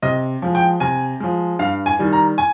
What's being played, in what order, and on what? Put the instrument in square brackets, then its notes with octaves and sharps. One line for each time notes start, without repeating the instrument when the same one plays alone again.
[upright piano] C3 D#5
F3 G#3
G5
C3 G#5
F3 G#3
G2 F5
G#5
D#3 G3
A#5
G#5